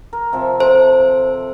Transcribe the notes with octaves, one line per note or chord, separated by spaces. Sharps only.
A#4
C3 F3 E5
A4 C5